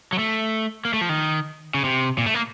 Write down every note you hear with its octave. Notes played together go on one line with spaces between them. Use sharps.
F#3
A3
A#3
A3
F3
D#3
C#3
C3
A#2
A3
A#3